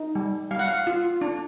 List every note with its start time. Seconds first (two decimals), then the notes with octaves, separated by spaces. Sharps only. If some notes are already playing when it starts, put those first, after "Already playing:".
Already playing: D#4
0.15 G3
0.51 G3 F5
0.59 F#5
0.68 F5
0.87 F4
1.21 D4